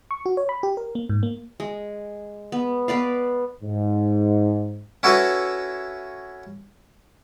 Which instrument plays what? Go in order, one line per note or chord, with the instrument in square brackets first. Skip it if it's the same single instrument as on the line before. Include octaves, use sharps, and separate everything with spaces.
[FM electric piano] C#6
F#4
C#5
B5
G4
A#4
A#3
G#2
A#3
[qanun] G#3
B3
B3 B4 D5 F5
[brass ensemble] G#2
[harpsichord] C#4 E4 F#4 A4 B4 C#5